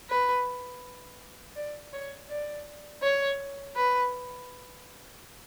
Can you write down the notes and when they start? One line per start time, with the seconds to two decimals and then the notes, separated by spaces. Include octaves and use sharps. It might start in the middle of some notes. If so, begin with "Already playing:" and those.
0.10 B4
1.55 D5
1.93 C#5
2.29 D5
3.02 C#5
3.76 B4